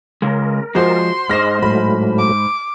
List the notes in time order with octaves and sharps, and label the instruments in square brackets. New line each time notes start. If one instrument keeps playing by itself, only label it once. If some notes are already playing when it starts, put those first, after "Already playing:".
[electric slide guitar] C#3 G#3 [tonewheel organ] A#4
[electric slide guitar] F3 G#3 [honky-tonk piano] F#4 C5 [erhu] C6
[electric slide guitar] G#2 C5 [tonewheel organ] G#3 D#4 [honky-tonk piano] F6 A#6
[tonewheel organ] A2 F#3 A3 [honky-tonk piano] B5
[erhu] D6